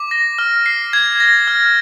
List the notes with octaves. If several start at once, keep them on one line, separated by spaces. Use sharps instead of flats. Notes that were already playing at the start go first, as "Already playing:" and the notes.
Already playing: D6
A#6
F6
C7
G#6
A#6
F6